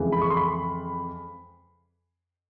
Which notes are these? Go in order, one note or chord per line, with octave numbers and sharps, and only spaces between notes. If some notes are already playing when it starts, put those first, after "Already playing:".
Already playing: F2 C#3 E3 G#3
B5
C#6
C6
B5